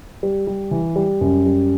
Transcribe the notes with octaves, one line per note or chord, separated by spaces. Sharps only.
G3
G3
E3
G3
F#2
G3